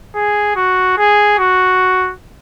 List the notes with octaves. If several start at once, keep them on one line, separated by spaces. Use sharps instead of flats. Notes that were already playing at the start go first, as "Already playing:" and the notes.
G#4
F#4
G#4
F#4